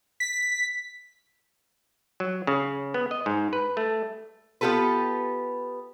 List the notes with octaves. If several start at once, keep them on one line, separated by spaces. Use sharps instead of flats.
B6
F#3
C#3
B3
D#5
G#2
B4
A3
B3 F4 G4 A4 B4